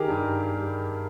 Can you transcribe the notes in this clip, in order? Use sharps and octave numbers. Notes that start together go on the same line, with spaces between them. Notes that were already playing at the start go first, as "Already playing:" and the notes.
Already playing: D#3 G4 G#4 A#4
G2
G3